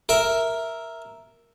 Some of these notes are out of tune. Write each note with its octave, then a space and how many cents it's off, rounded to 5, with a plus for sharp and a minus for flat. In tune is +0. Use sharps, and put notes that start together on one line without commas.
A#4 +0 E5 +0